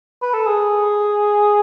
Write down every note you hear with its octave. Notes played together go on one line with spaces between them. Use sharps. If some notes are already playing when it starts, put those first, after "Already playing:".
B4
A4
G#4